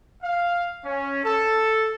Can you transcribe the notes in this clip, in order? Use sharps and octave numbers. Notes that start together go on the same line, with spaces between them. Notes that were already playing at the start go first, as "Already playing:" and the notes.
F5
C#4
A4